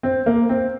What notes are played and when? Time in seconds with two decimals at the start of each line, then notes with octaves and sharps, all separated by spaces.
0.03 C4
0.26 A#3
0.49 C4